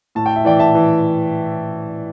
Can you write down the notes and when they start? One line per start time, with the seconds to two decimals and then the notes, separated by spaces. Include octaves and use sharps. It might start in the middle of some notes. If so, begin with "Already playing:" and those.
0.15 A2 A5
0.26 G5
0.36 E5
0.44 E3 D5 G5
0.59 E5 A5
0.75 E3